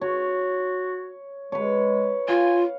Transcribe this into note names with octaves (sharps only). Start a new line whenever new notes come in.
F#4 C#5
G#3 B4 C#5
F4 F5 G#5